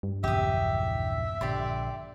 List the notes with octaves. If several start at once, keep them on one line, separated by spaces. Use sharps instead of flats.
G2
A#1 E2 C#3 G4 E5 D#6
A#1 D3 G4 D5 C6